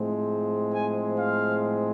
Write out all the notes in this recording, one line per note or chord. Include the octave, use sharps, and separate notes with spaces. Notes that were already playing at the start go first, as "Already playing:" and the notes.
Already playing: A2 F3 G#3 C4
G#5
F5